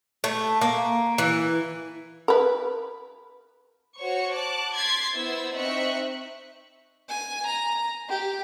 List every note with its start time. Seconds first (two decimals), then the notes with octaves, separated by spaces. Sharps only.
0.24 A3
0.61 A#3
1.18 E3
2.28 A#4 B4
3.98 F#4 C5 C#5 C#6
4.33 A5 D6 F#6
4.75 C6 G#6 A6 B6 C7
5.14 B3 E4 C5 E6
5.54 C4 D#4 E5 C#6 F#6
7.09 G#5
7.46 A#5
8.09 G4